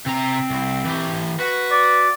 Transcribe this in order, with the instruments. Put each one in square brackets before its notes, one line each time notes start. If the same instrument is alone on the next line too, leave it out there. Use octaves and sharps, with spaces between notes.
[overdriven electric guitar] C3 A#5 [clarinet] C4
[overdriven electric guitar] C2
E3 G4
[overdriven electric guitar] F#4 [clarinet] B4
[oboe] D5